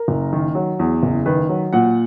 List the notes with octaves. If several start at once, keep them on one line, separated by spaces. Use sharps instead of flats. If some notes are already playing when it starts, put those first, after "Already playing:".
Already playing: A#4
F#1
D#3
F#3
E2
F#1
D#3 B4
F#3
A#2 F#5